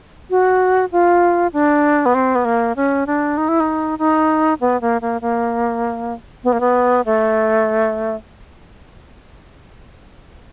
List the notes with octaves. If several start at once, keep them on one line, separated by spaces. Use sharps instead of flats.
F#4
F4
D4
B3
C4
B3
A#3
C#4
D4
D#4
E4
D#4
D#4
B3
A#3
A#3
A#3
B3
A#3
B3
A3